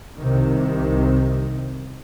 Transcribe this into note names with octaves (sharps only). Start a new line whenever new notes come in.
C2 C3 D#3